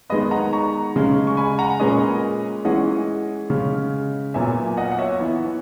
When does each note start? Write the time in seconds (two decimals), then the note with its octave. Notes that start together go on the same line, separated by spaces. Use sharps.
0.10 D#3 G#3 B3 B4 D#5
0.31 F#5 A#5
0.53 A#5 C#6
0.96 C#3 G#3 C#4
1.27 C#6
1.37 G#5 B5
1.59 F#5 A#5
1.80 A#2 G#3 C#4 B4 D#5
2.65 E3 G#3 C#4 D#5 F#5
3.50 C#3 G#3 C#4
4.34 A#2 F#3 B3 E5 G#5
4.77 D#5 F#5
4.92 F#5
4.99 C#5 E5
5.19 E3 B3